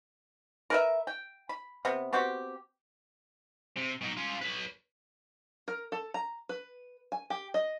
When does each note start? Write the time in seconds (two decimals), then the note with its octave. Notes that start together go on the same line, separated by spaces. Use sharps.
0.70 A#4 B4 E5
1.07 G5
1.49 B5
1.85 C3 B3
2.13 B3 C4 F#4 G4
3.76 C3
4.01 B2 D#4
4.17 C#4 F4
4.41 B4 C#5
5.68 A#4
5.92 A4
6.14 A#5
6.49 B4
7.12 G#5
7.30 G4
7.54 D#5